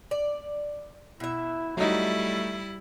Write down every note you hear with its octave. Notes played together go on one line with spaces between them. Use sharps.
D5
B2 E4 E5
F#3 G3 A3 D#4 E4